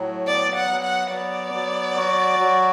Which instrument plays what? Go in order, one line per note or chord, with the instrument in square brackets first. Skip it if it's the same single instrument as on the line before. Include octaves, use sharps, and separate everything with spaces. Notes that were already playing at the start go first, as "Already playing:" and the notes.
Already playing: [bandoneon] A2 F#3
[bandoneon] B3 [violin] D5
[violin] F#5
[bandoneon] F#3
[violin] F#5
[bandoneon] B3 [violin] D5
[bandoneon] F#3
F#4
F#3